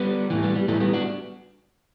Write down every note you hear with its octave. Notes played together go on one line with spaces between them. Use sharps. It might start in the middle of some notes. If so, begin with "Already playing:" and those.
Already playing: G3 B3
A2 E3
G3 B3
G3
A2 E3 A3
G3 B3
D4 F#4